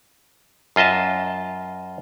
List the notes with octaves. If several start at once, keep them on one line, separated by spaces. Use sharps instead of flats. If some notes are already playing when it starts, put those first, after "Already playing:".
F#2 F4 D#5 E5 A5